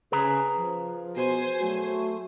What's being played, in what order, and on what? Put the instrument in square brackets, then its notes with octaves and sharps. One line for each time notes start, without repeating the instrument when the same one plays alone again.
[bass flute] C#3 [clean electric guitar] G#4 B4 A#5
[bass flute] F3
[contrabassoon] B2 [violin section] C5 G#5
[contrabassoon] F#3 [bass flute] A3